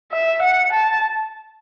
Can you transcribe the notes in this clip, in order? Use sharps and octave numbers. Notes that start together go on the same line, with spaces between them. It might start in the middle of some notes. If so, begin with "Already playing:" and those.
E5
F#5
A5